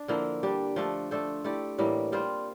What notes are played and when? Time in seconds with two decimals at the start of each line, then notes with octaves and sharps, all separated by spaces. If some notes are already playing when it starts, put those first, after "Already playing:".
Already playing: D4
0.08 D3 F3 A#3 E4
0.43 G3 D4 G4
0.76 F3 A3 D4 A4
1.11 A3 D4 A4 C5
1.44 A3 E4 G4 D5
1.78 A2 E3 G3 A#3
2.12 G3 C4 F4 C5